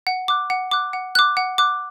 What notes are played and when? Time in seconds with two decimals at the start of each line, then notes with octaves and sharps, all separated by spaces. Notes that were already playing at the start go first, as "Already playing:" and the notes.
0.07 F#5
0.28 D6 F#6
0.50 F#5
0.71 D6 F#6
0.93 F#5
1.15 D6 F#6
1.37 F#5
1.58 D6 F#6